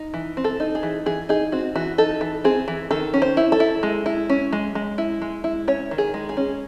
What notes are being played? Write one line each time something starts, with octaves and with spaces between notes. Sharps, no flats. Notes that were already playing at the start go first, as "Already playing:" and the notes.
Already playing: D#4
E3
C4
A4
D#4
G#4
E3
E3 G#4
D#4 G#4
C4 F#4
E3 F#4
D#4 A4
E3
C4 G#4
E3
D#3 A4
C#4
C5
E4
A4
E4
G#3
E4
C#4
G#3
G#3
E4
G#3
E4
C#4 C#5
D#3
G#4
G#3
G#4
C#4